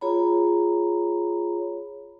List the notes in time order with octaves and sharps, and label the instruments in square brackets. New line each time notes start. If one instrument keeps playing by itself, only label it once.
[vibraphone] F4 G#4 C#5 A#5 B5